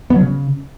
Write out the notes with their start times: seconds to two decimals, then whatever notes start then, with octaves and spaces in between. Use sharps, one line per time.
0.10 B3
0.16 F#3
0.21 C#3